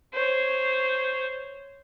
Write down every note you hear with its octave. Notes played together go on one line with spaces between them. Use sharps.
C5 C#5